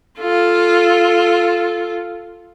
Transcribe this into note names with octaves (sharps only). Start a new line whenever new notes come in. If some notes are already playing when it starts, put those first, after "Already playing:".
F4 A4